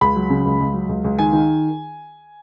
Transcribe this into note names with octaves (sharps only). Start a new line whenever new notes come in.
C#2 B5
F#3
C#3
C#2
C#2
F#3
C#2
C#2
D#3 G#5
D#3